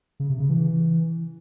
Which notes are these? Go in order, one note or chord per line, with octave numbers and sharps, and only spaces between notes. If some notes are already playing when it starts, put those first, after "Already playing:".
C#3
C3
C#3
E3